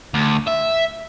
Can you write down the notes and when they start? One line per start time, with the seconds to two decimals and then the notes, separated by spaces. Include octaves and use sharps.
0.14 D2
0.48 E5